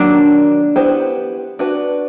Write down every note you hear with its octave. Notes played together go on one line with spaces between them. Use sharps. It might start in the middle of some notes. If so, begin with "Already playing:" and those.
Already playing: D#3 F#3 A#3 D4
B3 E4 G4 C5
D4 F#4 B4